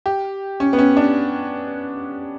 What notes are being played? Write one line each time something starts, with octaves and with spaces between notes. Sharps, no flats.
G4
C#4
B3
C#4
D4